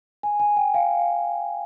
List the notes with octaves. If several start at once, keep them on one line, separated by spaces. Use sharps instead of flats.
G#5
G#5
G5
F5